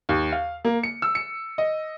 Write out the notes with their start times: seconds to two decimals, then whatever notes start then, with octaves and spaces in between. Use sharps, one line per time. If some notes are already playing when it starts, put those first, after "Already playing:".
0.09 D#2
0.32 F5
0.65 A#3
0.83 C#7
1.02 E6
1.15 C#7
1.58 D#5